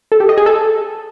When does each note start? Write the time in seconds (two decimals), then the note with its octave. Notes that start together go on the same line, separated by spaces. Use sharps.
0.12 A4
0.20 G4
0.29 D#5
0.38 G#4
0.46 A4